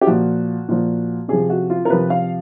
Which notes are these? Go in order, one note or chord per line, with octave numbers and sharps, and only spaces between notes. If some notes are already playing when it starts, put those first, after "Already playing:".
G4
A#2 F3 F#4
A#2 F3
C3 F3 G#4
F#4
F4
A#4
C3 F3 B4
F5